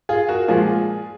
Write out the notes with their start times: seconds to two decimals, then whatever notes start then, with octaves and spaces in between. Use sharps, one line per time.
0.09 F4 G#4
0.29 F#4 A#4
0.48 A#2 F3 G#3 F4 G#4